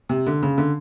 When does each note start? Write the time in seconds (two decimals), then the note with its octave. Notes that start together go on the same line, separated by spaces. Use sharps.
0.09 C3
0.27 D3
0.43 C#3
0.58 D3